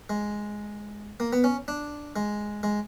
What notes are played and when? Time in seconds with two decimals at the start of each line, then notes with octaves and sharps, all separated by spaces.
0.10 G#3
1.20 A#3
1.33 B3
1.44 C#4
1.68 D4
2.16 G#3
2.63 G#3